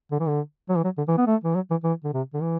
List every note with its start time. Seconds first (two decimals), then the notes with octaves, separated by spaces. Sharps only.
0.11 D3
0.20 E3
0.28 D3
0.70 F#3
0.77 E3
0.84 F#3
0.98 D3
1.08 E3
1.18 B3
1.27 A3
1.44 E3
1.55 F#3
1.71 E3
1.84 E3
2.04 D3
2.13 C3
2.34 D3
2.42 E3